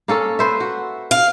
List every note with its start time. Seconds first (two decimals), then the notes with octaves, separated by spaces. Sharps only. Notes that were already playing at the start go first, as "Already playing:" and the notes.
0.08 A#3 C#4 A4
0.39 B4 C5 E5
0.60 F#4
1.11 F5